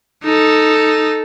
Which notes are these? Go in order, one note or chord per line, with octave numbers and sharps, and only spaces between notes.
D#4 A4